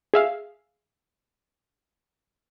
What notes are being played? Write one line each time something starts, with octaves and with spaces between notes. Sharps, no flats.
G#4 E5 F5